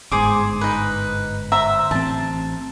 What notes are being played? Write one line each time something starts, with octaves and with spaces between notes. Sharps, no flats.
G1 G#2 G#4 C5 D6
D#4 B4
C5 E5 A#5
A1 C4 A5